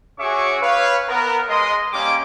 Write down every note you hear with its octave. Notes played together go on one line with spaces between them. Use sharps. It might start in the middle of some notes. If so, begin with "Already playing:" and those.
C#4 F#4 G#4 E5 C#6 D6
B4 C#5 F5
B3 A#4
G#3 D#5 C6
G3 A#3 C#4 D6